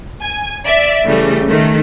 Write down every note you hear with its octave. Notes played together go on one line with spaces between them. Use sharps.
G#5
D5 E5
C#3 E3 G3 A3
D#3 A3